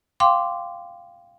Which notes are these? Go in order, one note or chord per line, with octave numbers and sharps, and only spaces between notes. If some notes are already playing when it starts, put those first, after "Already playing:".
F5 G5 C6 D6